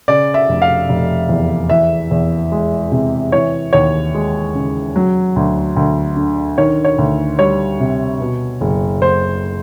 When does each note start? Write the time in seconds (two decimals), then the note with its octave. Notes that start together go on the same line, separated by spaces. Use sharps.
0.08 C#3 D5
0.34 E5
0.49 F1
0.62 F5
0.89 F1
1.29 E2
1.70 E3 E5
2.11 E2
2.52 G#3
2.92 C3
3.32 E3 C#5
3.73 D#2 C#5
4.14 G#3
4.54 C#3
4.96 F#3
5.36 D2
5.76 D2
6.16 D3
6.58 D#3 C#5
6.85 C#5
6.98 D2
7.39 G3 C#5
7.80 C3
8.21 B2
8.61 F#1
9.01 F#1 C5